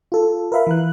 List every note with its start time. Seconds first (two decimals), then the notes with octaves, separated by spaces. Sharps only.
0.12 F4 A4
0.52 A#4 B4 E5 F5 B5
0.67 E3 F#6